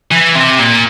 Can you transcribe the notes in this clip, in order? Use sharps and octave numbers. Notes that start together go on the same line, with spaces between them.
E3
C3
A#2